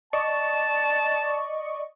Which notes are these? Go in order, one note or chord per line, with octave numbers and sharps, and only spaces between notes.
D5 D#5 A5 C#6